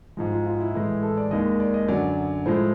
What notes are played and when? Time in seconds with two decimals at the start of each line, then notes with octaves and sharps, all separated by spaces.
0.17 G#2 F3 G#3
0.31 F4
0.46 F4
0.60 E4
0.74 A2 E3 G#3
1.03 A4
1.17 D5
1.31 D#2 D#3 G#3 D#5
1.60 D5
1.74 D#5
1.88 F#2 D3 F#3 D5
2.46 A2 F3 G#3 C5